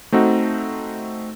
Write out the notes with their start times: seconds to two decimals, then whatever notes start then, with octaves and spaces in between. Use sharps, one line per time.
0.12 A3 C4 D#4 F#4